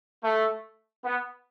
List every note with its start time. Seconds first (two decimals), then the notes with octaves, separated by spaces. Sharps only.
0.23 A3
1.05 B3